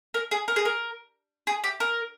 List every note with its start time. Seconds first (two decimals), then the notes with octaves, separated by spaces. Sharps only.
0.14 A#4
0.31 G#4
0.48 A#4
0.56 G#4
0.65 A#4
1.47 G#4
1.64 G4
1.80 A#4